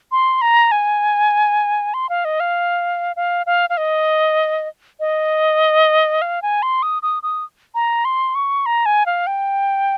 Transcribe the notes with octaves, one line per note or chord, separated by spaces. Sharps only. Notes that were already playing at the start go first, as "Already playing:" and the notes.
C6
A#5
G#5
C6
F5
D#5
F5
F5
F5
F5
D#5
D#5
F5
G#5
C6
D#6
D#6
D#6
A#5
C6
C#6
A#5
G#5
F5
G5